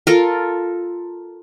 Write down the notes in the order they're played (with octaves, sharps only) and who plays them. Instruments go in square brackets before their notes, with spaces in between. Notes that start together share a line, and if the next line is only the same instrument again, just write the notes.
[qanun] F4 A4 A#4